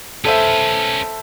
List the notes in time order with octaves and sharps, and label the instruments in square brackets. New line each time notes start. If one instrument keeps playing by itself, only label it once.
[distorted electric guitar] C#4 B4 [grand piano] A4 C5 E5